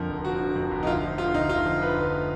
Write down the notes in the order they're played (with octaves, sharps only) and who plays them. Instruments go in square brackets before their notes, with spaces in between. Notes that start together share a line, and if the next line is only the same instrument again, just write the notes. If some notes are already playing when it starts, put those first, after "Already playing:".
Already playing: [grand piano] F2 D3 F3 A#4
F1
F3 F#4
D3
F2
F1
D#4
D2 F4
F3
D3 F4
D2 D#4
D2 F4
F3
D3 B4
D2